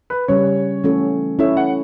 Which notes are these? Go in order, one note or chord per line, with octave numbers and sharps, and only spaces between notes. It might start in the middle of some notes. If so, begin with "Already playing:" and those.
B4
C#3 G3 C#4 C#5
E3 A3 C#4 F#4 A4
C#4 E4 A4 C#5 E5
F#5